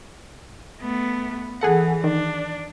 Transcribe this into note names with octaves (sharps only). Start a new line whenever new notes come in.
A3 B3
E3 G#4 A4 F#5
D#3 D4